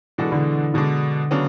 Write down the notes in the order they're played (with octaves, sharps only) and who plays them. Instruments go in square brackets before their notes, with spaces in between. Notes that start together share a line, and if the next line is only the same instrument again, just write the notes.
[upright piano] B2 G#3 D4 F#4 A4 [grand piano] E3
[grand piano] D3
[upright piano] B2 G#3 D4 [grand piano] D3
[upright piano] C#3 F#3 B3 D4